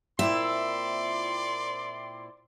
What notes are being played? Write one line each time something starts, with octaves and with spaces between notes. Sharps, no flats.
A#2 C4 E4 D5 E5 C6